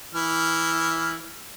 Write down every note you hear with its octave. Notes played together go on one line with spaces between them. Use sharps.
E3 E4 F6